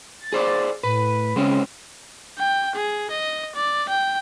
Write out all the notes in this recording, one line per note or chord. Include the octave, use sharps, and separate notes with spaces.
A6
G#4 C5 D5
A2 B4
C#3 G#3 C4 C#4
G5
G#4
D#5
D5
G5